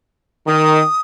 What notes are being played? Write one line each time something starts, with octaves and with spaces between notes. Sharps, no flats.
D#3 D#6